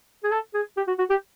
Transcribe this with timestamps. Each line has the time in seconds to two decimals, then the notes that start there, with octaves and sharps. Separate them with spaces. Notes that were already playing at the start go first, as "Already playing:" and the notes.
0.24 G#4
0.32 A4
0.54 G#4
0.77 G4
0.88 F#4
0.98 F#4
1.10 G4